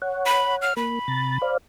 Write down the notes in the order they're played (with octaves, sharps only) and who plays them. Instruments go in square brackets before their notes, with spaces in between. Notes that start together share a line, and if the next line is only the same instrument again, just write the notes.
[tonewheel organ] C#5 F#5
[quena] B5
F6
[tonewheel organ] A#3 [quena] B5
[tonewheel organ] C3 A#5 A6
C5 D5 F5